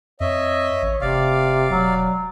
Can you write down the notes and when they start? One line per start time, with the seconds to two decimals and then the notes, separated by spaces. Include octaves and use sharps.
0.20 F2 C#5 D#5 E5
0.82 A1
1.01 F1 C3 D5 F5
1.70 E1 F#3